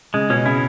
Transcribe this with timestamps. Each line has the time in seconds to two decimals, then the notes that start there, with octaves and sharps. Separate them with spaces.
0.14 C#3 G#3
0.30 B2 C#4
0.46 C#3 E4